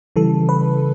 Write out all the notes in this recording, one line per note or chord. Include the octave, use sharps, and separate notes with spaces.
C#3 E3 G3 A4
B4